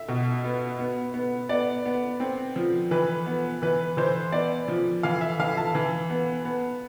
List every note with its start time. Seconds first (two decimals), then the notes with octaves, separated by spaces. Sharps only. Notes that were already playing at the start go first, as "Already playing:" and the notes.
Already playing: E5
0.08 B2
0.44 B3
0.79 B3
1.14 B3
1.49 B3 D5
1.85 B3
2.20 C4
2.56 F3
2.91 E3 B4
3.26 B3
3.62 E3 B4
3.97 E3 C5
4.32 B3 D5
4.68 F3
5.03 E3 F5
5.21 E5
5.39 E3 F5
5.57 A5
5.75 E3
6.10 B3
6.45 B3